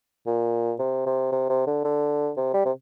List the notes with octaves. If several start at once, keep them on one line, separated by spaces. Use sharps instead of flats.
A#2
C3
C3
C3
C3
D3
D3
C3
G3
C3